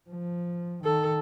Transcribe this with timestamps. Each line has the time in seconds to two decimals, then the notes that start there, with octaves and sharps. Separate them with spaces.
0.10 F3
0.84 D#3 A4